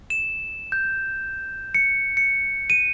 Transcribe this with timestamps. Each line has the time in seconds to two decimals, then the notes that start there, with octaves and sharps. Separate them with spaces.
0.10 E7
0.72 G6
1.74 C#7
2.17 C#7
2.70 D#7